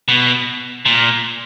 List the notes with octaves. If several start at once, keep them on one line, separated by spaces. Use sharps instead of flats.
B2
A#2